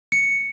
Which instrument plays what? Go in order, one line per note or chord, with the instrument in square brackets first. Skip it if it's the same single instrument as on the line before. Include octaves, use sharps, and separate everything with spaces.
[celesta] C#7